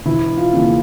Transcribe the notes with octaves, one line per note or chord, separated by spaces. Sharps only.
E1 E4
F4
D#2 C#3 E3